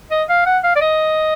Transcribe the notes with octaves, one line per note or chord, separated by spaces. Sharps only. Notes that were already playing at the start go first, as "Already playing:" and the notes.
D#5
F5
F#5
F5
D5
D#5